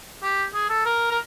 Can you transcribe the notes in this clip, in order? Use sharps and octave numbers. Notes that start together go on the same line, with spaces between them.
G4
G#4
A4
A#4
A#4